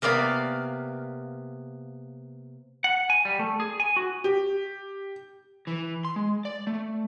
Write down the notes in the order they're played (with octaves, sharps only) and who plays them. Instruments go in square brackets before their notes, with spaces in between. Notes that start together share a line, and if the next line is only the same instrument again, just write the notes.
[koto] C3 A#3 B3 D5 F5
[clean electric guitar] F#5
G#5
G3
A3
G#4
G#5
F#4
[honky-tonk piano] G4
[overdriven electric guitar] E3
C6
G#3
D5
A3